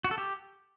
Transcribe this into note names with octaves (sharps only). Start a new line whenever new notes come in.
F#4
A4
G4